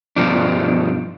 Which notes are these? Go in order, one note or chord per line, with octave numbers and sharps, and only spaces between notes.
G2 B2 F3 D4